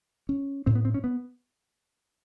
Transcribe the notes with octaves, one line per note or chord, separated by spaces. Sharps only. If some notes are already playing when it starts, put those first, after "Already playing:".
C#4
A2 C4
B3
C4
C#4
B3